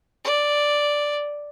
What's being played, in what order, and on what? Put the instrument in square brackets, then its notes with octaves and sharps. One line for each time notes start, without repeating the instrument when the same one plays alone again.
[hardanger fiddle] D5